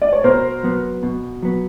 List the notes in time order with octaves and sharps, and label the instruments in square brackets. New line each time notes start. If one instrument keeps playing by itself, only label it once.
[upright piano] D5
C#5
[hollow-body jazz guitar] B2 [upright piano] A#4 C5
[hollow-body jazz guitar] F#3 B3
B2
F#3 B3